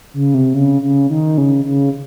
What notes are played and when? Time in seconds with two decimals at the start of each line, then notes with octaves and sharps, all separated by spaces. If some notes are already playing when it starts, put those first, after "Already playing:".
0.14 C#3
0.34 C3
0.54 C#3
0.82 C#3
1.10 D#3
1.38 C#3
1.65 C#3